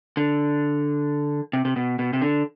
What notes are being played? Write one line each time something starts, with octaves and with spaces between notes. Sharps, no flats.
D3
C3
C3
B2
B2
C3
D3